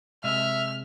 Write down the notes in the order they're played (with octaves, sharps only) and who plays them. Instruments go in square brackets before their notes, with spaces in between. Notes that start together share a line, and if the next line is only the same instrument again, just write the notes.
[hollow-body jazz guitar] C3 G#3 D#5 [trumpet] E5 [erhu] F6